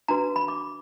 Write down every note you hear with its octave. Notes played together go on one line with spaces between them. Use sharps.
D4 F#4 B4 A#5
B5
D6